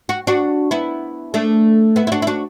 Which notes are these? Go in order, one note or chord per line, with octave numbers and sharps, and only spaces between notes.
F#4
D4 F#4
B3 E4
A3 D4
B3 E4
E4
D4 F#4
E4
D4 F#4